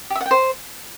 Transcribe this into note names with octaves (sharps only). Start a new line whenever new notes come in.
G4
E5
F#5
G5
C5